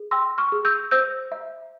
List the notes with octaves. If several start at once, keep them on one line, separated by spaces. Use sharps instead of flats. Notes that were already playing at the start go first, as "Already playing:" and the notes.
Already playing: G#4
G5 C6 E6
C#6 F6
G#4
E6 G6
C5 E6 G6
E5